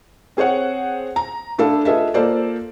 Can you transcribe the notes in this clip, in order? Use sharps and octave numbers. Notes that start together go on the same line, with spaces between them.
C4 G#4 C5 C#5 F#5
A#5
A3 D4 E4 A4 F5
F4 G#4 A4 B4 D#5 E5
A#3 F4 A4 C5 D5